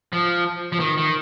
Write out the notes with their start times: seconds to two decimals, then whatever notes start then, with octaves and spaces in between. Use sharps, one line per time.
0.13 F3
0.72 F3
0.80 D#3
0.97 D#3